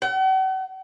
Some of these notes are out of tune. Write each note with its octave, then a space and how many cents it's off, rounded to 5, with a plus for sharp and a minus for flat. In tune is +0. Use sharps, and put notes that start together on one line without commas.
F#5 +45